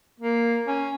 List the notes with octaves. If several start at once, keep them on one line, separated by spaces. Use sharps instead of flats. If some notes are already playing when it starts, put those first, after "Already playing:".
A#3
C#4